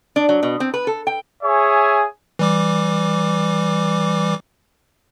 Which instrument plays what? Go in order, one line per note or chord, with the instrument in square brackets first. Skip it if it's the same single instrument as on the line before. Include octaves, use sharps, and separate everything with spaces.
[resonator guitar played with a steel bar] D4
F#3
B2
C4
B4
A4
G5
[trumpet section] G#4 C#5 E5 G#5
[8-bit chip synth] E3 G3 D6